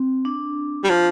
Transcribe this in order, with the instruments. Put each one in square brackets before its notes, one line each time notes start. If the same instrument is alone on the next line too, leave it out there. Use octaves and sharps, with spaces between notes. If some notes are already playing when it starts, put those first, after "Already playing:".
Already playing: [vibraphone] C4
D4
[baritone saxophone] G3
F3